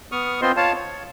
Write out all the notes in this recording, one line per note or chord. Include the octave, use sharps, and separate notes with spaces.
B3 C#6 D#6 F6
B3 C4 F4 C5 D#5 C6
F4 C#5 F5 A5
C#5